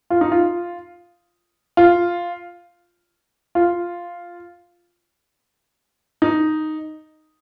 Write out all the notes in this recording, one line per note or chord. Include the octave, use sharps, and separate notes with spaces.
F4
D#4
F4
F4
F4
D#4